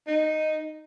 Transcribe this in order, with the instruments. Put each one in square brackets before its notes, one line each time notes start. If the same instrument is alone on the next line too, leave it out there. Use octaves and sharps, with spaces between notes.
[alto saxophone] D#4